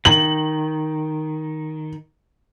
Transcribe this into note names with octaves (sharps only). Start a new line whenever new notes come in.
D#3 F#7